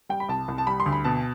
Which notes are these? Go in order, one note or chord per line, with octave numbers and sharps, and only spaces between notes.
G3 G5
B5
C2 A5
C2
A5
G3 B5
C6
D2
B5
B2 A5